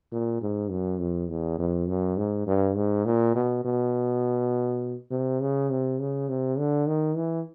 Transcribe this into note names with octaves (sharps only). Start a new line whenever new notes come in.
A#2
G#2
F#2
F2
E2
F2
F#2
G#2
G2
G#2
A#2
B2
B2
C3
C#3
C3
C#3
C3
D3
D#3
E3